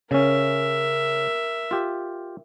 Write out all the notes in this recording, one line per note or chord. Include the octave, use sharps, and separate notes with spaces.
C#3 C#4 A#4 E5
F4 G4